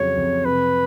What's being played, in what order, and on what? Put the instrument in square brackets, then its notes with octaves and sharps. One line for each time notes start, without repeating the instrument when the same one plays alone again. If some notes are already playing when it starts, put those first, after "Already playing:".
Already playing: [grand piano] F2 C#3 F#3 [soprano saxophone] C#5
[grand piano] F2
[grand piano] C3 [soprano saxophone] B4